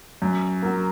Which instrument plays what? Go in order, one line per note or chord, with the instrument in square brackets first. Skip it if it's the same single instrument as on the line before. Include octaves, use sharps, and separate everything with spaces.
[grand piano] F#2
F#3 A#3